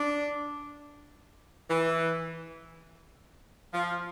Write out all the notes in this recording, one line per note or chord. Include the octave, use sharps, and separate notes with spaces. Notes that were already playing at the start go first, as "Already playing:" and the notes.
Already playing: D4
E3
F3